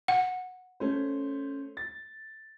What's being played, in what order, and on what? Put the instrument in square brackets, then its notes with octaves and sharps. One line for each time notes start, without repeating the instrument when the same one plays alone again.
[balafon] F#5
[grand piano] A3 C#4 C5
A6